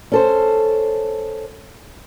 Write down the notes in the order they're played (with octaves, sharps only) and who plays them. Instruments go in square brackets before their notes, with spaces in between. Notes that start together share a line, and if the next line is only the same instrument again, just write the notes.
[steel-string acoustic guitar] C#4 A4 C5